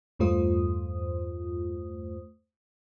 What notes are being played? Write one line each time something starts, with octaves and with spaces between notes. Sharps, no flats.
E2 G2 A3 F4 C5 D#6